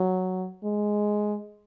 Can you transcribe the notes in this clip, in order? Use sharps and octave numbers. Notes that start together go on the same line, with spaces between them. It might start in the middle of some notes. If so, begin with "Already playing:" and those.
Already playing: F#3
G#3